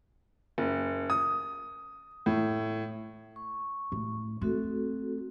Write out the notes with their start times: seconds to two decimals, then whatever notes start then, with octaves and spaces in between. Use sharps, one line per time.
0.58 F#1
1.10 D#6
2.26 A2
3.36 C#6
3.92 A2
4.41 A3 C4 F#4 A4